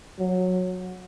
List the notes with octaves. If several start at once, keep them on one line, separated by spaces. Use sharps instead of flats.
F#3